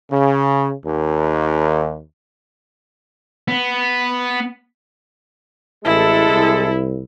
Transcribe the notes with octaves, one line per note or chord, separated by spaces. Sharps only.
C#3
D#2
B3
A1 G#3 E4 G#4 A4
C2